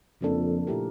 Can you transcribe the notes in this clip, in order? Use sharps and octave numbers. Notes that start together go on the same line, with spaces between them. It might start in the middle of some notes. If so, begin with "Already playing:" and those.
F2 C#3 F3 A#3 D4 A4
A#2 A3 E4 G4 A#4